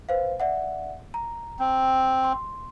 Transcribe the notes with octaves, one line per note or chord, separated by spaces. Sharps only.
B4 C5 F5
D5 E5 F#5
A#5
C4
C6